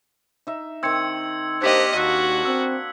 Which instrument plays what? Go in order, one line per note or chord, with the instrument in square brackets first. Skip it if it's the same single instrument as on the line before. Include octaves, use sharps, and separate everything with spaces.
[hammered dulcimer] D#4 E5
[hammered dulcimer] D#3 C4 [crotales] E6 G#6 C#7
[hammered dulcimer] A#3 D4 [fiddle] G4 D#5 [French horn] C5 [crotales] G#6 B6 F#7
[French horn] D#2 [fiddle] F#4 [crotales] E6 F#6 B6
[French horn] C4 [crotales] E6